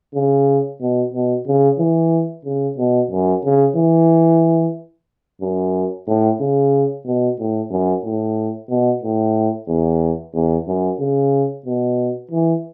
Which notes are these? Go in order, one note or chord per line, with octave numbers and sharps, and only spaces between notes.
C#3
B2
B2
C#3
E3
C#3
B2
F#2
C#3
E3
F#2
A2
C#3
B2
A2
F#2
A2
B2
A2
E2
E2
F#2
C#3
B2
E3